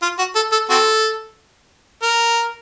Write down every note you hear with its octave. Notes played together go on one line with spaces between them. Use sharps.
F4
F#4
A4
A4
C4 F#4 A4
A#4